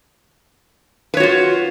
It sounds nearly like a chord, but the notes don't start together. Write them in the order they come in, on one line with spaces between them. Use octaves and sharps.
B4 C#5 F#4 F4